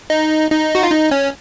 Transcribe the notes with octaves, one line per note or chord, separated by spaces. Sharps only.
D#4
D#4
F#4
F4
D#4
C#4